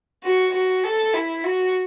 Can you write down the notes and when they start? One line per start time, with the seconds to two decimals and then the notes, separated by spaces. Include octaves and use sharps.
0.23 F#4
0.54 F#4
0.84 A4
1.13 E4
1.44 F#4